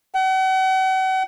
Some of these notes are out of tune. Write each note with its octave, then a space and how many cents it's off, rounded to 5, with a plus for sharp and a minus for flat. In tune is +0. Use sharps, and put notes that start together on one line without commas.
F#5 +40